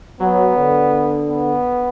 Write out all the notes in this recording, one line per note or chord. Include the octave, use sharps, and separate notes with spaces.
F#3 B3
D3
B3